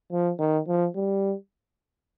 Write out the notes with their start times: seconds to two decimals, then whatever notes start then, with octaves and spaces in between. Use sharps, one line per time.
0.12 F3
0.39 D#3
0.68 F3
0.95 G3